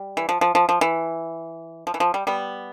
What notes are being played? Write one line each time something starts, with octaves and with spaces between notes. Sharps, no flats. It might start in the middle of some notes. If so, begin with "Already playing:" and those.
Already playing: G3
E3
F3
F3
F3
F3
E3
F3
E3
F3
G3
G3 B3